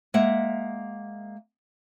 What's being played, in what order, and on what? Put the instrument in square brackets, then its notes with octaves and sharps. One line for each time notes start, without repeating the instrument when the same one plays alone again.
[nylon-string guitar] G#3 A#3 E5 F#5